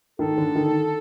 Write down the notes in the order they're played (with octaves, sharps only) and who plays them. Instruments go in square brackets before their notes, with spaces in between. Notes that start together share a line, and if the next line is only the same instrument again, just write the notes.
[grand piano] D#3 [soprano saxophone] A4
[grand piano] D3
D#3